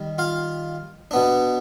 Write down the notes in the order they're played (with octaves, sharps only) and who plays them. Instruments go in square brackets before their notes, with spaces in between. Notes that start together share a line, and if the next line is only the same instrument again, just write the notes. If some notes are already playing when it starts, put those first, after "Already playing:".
Already playing: [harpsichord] D#3 G3
F4 F5
B2 B3 D4